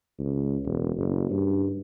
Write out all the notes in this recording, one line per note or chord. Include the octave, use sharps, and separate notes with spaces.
C#2
E1
F#1
G2